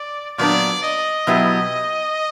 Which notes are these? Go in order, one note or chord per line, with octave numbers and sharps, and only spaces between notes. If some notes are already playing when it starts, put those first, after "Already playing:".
Already playing: D5
A#2 F#3 B3 D4 D5
D#5
B2 F#3 B3 E4 G4